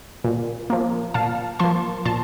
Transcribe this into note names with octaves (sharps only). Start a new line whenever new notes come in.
A#2
F3 A#3
A#2 F5 A5
F3 A#3 A5 C6
A#2 A5 C6